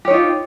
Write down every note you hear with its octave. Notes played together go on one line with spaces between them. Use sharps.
D#4 F4 G4 C#5